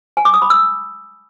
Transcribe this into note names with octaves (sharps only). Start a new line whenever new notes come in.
G#5
D6
D#6
B5
E6